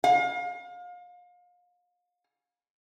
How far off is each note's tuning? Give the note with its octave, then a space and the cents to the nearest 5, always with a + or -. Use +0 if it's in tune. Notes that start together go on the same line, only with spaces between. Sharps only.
F5 +35